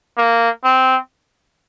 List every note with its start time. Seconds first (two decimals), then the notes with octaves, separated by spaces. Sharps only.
0.18 A#3
0.64 C4